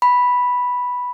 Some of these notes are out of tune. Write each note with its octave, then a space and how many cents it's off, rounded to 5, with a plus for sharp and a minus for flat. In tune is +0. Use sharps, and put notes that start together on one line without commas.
B5 -5